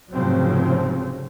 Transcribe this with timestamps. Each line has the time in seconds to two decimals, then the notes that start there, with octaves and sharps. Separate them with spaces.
0.14 F1 G#2 C#3 F3 F#3 C4